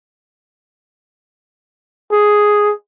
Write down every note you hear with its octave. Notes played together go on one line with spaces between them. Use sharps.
G#4